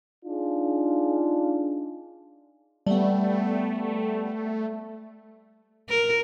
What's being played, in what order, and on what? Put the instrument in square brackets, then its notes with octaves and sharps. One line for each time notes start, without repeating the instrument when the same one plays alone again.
[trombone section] D4 D#4 F4 G#4
[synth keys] G3 B3 [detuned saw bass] A3
[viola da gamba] A#4